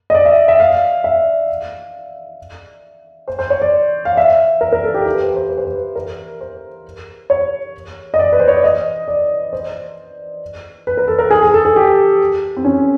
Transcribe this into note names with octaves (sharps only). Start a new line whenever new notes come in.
D#5
D5
E5
E5
F5
E5
C5
C5
C#5
D5
F5
E5
A#4
A#4
A4
G4
G4
B4
C5
C5
B4
C5
B4
A#4
C5
C#5
D#5
D5
B4
C5
C#5
D5
D#5
D5
C5
B4
A#4
A4
A#4
G#4
G#4
A4
G#4
G4
C4
C#4